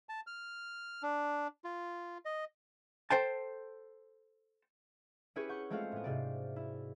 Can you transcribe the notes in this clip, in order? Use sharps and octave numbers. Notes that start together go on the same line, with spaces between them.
A5
F6
D4
F4
D#5
A4 C5 G5 A5
C#4 E4 G4 G#4 B4 C#5
F#5 C#6 G6
G#3 A3 C4 F4 F#4 F5
A2 B3
G#2 C3 D5
E4